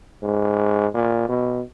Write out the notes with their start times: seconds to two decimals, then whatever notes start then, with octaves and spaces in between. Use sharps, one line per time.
0.23 G#2
0.94 A#2
1.29 B2